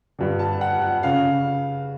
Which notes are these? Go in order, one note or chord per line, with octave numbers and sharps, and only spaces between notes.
G2 D3
A5
F#5
F#5
C#3 F5